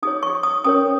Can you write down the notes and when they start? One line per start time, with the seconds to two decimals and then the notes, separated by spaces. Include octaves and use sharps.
0.02 D#4 G#4 C#5 D#6
0.23 C#6
0.43 D#6
0.64 C#4 A#4 C#5 D#6